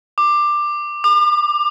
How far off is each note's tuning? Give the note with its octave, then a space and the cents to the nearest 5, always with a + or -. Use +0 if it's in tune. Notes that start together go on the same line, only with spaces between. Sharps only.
D6 +15
D6 +40